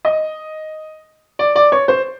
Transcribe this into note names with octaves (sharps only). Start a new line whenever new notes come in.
D#5
D5
D5
C#5
C5